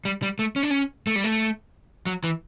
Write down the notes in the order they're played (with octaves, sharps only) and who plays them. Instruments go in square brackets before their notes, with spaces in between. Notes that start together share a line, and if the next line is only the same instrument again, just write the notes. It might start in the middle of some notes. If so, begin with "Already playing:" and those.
[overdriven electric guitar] G3
G3
A3
C#4
D4
C#4
A3
G3
A3
F#3
E3